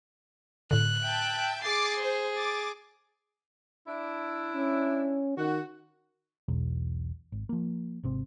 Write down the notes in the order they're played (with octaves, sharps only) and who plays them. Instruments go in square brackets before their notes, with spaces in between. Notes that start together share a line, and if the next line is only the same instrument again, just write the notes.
[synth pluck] A2 D3 [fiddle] F#6
[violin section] E5 G5 A5
[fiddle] G#4 [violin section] D6 A6 C7
[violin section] C5
D6 A6
[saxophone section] D4 E4
[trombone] C#4
[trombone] D#3 [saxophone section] F#4
[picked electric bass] E1 B1 E2
G#1
F3 A#3
G#1 C3 C4